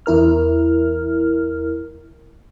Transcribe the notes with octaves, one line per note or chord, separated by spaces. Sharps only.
E2 E4 A#4 F6